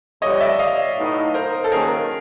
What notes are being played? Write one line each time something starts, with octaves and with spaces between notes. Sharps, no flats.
F2 D3 G3 B3 C#5 D#5
D5 E5
D#5 F5
A2 F#3 B3 D#4
A#4 C5
A4
D#3 F#3 A#3 C#4 G#4 A#4